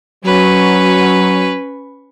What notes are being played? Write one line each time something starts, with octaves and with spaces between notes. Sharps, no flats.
F#3 C#4 B4